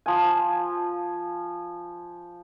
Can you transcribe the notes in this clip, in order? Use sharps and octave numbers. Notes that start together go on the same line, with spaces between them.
F3 G#5